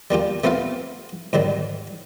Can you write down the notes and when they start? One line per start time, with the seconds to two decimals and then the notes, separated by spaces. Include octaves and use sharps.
0.10 G3 A#3 F4 G4
0.44 A3 B3 C4 F4 F5
1.33 G#2 D#3 F#3 G3